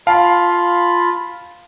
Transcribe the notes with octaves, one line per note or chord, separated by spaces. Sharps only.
F4 F5 A5 B5